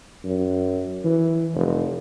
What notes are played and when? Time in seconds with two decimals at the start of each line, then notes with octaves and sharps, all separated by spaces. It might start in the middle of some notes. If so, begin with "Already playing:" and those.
0.24 F#2
1.04 E3
1.54 F1